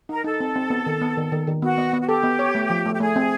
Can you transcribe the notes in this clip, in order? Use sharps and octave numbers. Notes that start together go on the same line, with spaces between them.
D#4 A#4
D#4 A4
C4
C4
B3
D#3
B3
D#3
D#3
D#3
B3 F#4
B3
B3
F#4
G4 A4
B3
C#5
A3
F3
A3
G4
A3 G#4
C4